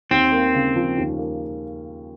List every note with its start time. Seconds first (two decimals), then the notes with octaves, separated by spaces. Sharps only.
0.11 D#2 C4
0.32 A#3
0.54 C#3
0.76 F3
0.97 D#2
1.19 A#3